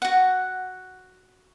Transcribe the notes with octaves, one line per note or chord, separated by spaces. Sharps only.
F#4 F#5